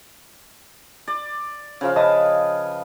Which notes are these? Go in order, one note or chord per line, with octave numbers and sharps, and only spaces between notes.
D5
C#3 F3 F5
B4 D#5 A5 D#6